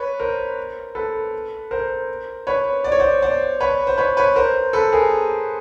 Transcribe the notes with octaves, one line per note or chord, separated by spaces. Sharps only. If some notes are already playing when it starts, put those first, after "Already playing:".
Already playing: B4 C#5
A#4 C5
A4 B4
A#4 C5
B4 C#5
D5
C#5
C5 D5
C5 D5
B4 C#5
C5
B4 C#5
B4 C#5
A#4 C5
A4 B4
G#4 A#4